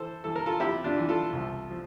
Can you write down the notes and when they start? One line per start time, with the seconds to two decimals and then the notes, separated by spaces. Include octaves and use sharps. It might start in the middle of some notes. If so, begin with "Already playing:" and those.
Already playing: E3 A4 C5
0.24 E3 A4
0.36 A#4
0.46 F4 A4
0.60 F2 E4 G4
0.84 D4 F4
0.97 E3
1.09 F4 A4
1.33 C2
1.70 F3